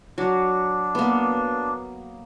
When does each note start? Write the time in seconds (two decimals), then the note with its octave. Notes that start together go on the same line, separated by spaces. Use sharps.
0.18 F#3 D4
0.95 A#3 B3